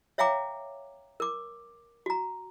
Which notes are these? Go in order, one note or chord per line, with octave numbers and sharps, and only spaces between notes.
C#5 E5 F5 G5 A#5 D6
A#4 D6
F#4 A#5